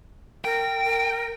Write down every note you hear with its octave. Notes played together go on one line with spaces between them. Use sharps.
A#4 G5
A#4